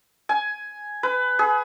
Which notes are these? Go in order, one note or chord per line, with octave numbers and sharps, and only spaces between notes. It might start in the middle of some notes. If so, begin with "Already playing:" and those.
G#5
B4
G#4